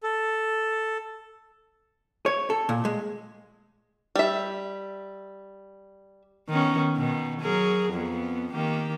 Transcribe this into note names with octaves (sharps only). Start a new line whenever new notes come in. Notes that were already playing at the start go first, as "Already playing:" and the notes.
A4
C#5
A4
A#2
G#3
G3 E5
D#3 B3 C#4
B2 D#3
F#3 G#4 A#4
F2 B3
D#3 A#3 G4